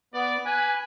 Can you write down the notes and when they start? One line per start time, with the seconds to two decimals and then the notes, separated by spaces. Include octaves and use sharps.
0.14 B3 D5
0.46 B4 G#5